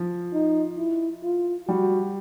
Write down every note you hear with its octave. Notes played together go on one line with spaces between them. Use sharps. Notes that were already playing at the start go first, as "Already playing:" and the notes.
Already playing: F3
D#4
E4
F4
G3 F#4